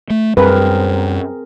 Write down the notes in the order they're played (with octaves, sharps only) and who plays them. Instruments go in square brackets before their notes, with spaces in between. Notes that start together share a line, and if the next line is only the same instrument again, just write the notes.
[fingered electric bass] A3
[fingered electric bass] F#2 G3 [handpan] C4 G#4 A#4 [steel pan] B4